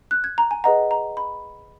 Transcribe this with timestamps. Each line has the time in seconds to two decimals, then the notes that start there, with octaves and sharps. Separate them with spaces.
0.11 F#6
0.24 G#6
0.38 A#5
0.51 G#5
0.64 G#4 B4 D#5 F#5 A#5
0.91 A#5
1.17 B5